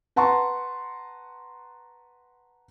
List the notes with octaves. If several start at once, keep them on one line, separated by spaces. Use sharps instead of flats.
B4 F#5 A5 A#5 C6 C#6